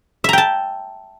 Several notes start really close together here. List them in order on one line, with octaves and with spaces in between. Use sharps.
E5 A#5 G5 A5